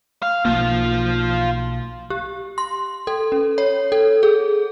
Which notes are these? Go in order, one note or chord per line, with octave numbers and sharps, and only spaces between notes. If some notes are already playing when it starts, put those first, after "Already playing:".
F5
B1 F3 A#3 F4
G4
C6
A4
C#4
C#5
A4
G#4